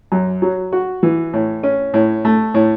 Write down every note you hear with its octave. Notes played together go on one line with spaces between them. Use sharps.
F#2
F#3
F#4
E3
A2
C#4
A2
A3
A2